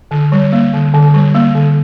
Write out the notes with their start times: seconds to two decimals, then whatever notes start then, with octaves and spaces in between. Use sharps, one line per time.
0.11 D3
0.32 G3
0.53 A#3
0.73 D3
0.94 D3
1.14 G3
1.35 A#3
1.55 D3